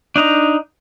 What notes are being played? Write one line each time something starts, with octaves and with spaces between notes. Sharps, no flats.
D4 D#4 A#5